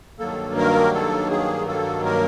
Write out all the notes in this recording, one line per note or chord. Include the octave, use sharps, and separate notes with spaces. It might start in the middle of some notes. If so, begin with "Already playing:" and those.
G2 D#3 F#3 A#3 A4
A#4
A4
G#4
A4
A#4